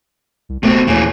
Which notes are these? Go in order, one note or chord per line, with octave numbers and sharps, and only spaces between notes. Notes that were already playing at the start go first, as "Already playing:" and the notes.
C2
E1 B2 A3 C4
D#2 A#2 E3 G#4 C#5